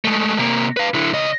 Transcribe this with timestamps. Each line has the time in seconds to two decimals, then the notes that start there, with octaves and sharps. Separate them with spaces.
0.05 G#3 A3
0.39 C3 A#3
0.77 B4 F5
0.94 D3 E4
1.13 C#3 D#5